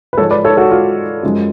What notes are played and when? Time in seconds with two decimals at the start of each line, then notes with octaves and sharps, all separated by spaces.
0.13 B4
0.17 G#2 F3 G#3 A4 C#5
0.31 B4 D5
0.44 A4 C#5
0.57 F#4 A4
0.71 F4
1.23 F#2 F3 G#3